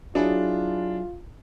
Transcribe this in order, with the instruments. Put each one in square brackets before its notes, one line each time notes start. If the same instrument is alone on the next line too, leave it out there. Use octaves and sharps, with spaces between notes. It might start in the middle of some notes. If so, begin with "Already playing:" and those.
[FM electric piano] F#3 E4 G#4 [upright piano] D4 [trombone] F4